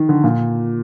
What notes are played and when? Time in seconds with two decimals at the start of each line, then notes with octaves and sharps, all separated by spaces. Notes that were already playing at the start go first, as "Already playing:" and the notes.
Already playing: D#3
0.09 D3
0.24 A#2